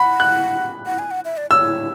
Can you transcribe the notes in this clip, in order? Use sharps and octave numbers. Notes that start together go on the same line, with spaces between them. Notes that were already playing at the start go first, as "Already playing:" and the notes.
Already playing: F#5 B5
F#6
F#5
G#5
F#5
E5
D5
C#5 E6